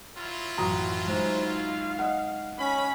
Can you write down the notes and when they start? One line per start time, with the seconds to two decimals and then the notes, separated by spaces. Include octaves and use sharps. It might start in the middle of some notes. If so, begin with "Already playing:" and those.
0.18 F#3 E4 F4 A6
0.58 A1 F#2 F#4 A#5 D#6
1.07 G#3 D#4 C5
1.47 F5
1.99 D#5 F#5
2.59 C#4 B5